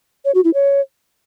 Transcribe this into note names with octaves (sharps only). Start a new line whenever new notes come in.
C#5
F#4
E4
C#5